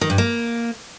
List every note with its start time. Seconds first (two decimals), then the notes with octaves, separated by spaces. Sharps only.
0.01 D#3
0.10 G2
0.18 A#3